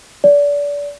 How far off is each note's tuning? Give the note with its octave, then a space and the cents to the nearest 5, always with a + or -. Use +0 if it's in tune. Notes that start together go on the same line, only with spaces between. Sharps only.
D5 -30